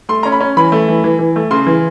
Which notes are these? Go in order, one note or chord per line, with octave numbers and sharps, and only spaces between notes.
A3 C6
C#4 A#5
B5
C#4
E3 B5
A3
E3
E3
E3
A3
C#3 C6
E3